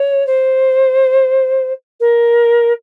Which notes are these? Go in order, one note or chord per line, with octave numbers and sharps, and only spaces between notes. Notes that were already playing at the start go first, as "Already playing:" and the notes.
Already playing: C#5
C5
A#4